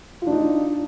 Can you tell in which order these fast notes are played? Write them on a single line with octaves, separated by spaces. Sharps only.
F4 D4 D#4